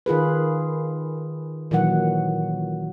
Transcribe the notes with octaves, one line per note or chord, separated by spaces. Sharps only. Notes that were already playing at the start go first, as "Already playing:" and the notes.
D#3 F4 G#4 B4
A#2 D#3 E3 F#3 F#5